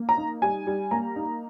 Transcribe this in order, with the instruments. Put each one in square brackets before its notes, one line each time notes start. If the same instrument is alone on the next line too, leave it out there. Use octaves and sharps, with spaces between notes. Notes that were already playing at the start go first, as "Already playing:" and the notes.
Already playing: [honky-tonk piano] A#3
[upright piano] A#5
[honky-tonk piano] D#4
[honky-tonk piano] G3 [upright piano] G#5
[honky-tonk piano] G3
[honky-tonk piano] A#3 [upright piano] A#5
[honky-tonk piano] D#4